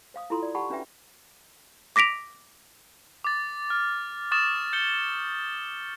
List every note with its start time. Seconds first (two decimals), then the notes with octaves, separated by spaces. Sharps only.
0.14 C5 F5 D#6
0.30 E4 F4 A4 A#5 C6
0.42 D5
0.55 G4 F#5 A5 B5 C#6
0.70 C#4 D4 F#4 B4 E5 G5
1.96 D6 A#6 B6 D7 F7
3.24 D6 A6
3.70 F6
4.32 C#6 D#6 F6 A6 E7
4.73 G6 C#7 G7